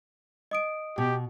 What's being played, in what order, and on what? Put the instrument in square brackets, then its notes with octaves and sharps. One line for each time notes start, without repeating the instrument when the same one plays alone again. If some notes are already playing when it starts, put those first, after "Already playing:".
[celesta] D#5 D#6 D7
[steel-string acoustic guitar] B2 [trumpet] G4